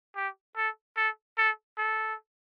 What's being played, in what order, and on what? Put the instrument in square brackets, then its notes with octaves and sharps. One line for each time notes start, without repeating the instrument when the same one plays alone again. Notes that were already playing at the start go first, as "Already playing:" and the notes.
[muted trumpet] G4
A4
A4
A4
A4